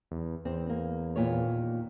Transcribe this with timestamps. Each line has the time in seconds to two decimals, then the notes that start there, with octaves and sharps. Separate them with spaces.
0.11 E2
0.45 E2 C4
0.69 A#3
1.16 D#2 A#2 C#5